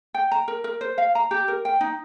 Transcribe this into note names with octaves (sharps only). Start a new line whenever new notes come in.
G5
A#5
A#4
A#4
C5
F5
A#5
G4
A#4
G5
D#4